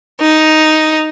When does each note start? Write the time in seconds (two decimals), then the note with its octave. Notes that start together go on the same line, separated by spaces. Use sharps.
0.20 D#4